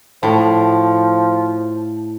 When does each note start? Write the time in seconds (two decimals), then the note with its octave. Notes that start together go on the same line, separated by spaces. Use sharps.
0.23 A2 F3